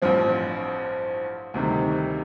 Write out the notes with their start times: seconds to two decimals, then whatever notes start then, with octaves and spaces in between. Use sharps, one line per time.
0.02 A1 G2 F3 C4
1.54 D2 C3 D#3 G3